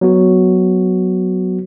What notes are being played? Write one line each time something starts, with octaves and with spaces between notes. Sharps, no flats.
F#3 B3 F#4